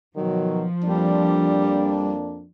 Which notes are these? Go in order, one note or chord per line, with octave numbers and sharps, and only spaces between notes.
B2 D#3 F3 F#3
F2 G3 A#3 D4